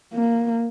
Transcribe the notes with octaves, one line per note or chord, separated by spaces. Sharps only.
A#3